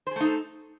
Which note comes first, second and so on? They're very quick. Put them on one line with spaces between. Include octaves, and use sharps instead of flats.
C5 G#4 A3 D#4 A4